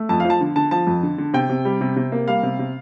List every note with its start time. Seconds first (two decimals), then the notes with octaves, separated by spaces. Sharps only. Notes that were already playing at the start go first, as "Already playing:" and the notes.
Already playing: A3
0.09 F2 A5
0.20 F5
0.25 F3
0.30 A5
0.40 D3
0.56 D3 A5
0.71 F3 A5
0.87 F2
1.03 D3
1.18 D3
1.34 C3 G5
1.50 C3
1.65 G3
1.81 C3
1.96 C3
2.12 A#3
2.27 G3 F5
2.43 C3
2.59 C3